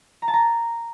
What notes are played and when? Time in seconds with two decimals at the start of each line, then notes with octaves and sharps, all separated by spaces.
0.22 A#5
0.28 A5
0.33 A#5